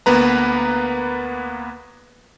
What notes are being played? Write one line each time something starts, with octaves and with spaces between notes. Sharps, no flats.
D2 A#3 B3 B4 A#5